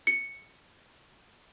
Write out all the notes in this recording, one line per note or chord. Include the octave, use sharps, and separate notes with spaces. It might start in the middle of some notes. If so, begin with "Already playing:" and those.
C#7